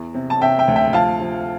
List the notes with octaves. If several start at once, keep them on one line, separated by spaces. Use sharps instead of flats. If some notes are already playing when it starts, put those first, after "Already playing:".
Already playing: E2
C3
A5
C3 E5 G5
E5 G5
D2
E5 G5
F3 F5 A5
F3